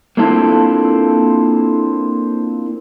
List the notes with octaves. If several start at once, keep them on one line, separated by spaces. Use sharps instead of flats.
A#3 C4 D4 E4 F4 A4